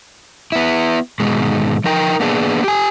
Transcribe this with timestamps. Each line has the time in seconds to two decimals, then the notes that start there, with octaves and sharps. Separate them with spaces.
0.52 B3 E4
1.20 G#2 B2 D#3 G#3
1.84 F3 D#4 A#4 G5
2.20 A#3 B3 D4 G#4
2.64 G4 G#5